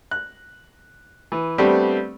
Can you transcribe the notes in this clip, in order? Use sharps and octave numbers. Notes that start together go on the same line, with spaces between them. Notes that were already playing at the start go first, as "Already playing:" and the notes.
F#6
E3
G3 A3 B3 C4 D4 G4